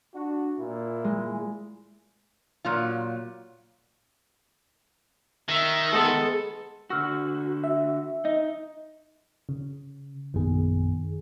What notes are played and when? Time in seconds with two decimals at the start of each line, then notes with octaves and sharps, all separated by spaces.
0.14 D4 F#4
0.58 A#2 E4
1.04 G#3
2.65 A#2 F#3 F4
5.49 D#3 E5
5.92 G#3 B3 A4
6.90 D3 F#4 C#6 E6 F6
7.64 E5
8.25 D#4 D#5
9.49 C#3
10.34 A#1 F#2 D#3 B3 G#4